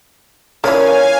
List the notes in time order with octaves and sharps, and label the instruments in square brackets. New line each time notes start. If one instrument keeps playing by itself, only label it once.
[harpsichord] A#2 C#4 [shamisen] E3 A#3 [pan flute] C#5 [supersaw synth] F5 G#5